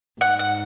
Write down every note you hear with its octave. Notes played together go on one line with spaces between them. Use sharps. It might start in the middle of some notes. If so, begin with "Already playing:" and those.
G#2 F#5
F#5